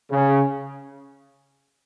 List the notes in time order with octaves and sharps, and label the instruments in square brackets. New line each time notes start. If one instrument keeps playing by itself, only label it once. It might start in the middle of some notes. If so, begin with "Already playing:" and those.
[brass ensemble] C#3